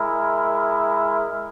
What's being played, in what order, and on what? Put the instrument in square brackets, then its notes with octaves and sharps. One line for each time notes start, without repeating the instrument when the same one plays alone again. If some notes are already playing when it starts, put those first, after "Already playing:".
Already playing: [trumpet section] G#3 E4 A#4